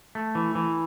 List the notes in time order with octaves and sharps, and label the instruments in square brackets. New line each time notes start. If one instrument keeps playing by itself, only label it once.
[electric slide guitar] A3
E3
E3